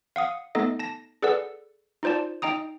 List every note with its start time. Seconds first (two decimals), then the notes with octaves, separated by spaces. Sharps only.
0.16 F5 F#5 D#6
0.55 A3 B3 D#4 A4 D#5
0.79 A5 A#6
1.22 G#4 A4 B4 D5 F#5 E6
2.03 D#4 F4 C5 D5 A5
2.42 D#4 D#5 G5 A#5 D#6